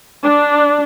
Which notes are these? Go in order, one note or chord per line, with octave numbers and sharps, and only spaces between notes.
D4